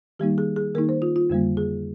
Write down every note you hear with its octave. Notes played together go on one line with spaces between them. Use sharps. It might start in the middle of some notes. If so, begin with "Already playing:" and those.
D#3 G3 A#3 D#4 G4
G#4
G#4
D#3 A#3 D#4 A#4
C5
F4
F4
F2 D3 G3 A#3
G#4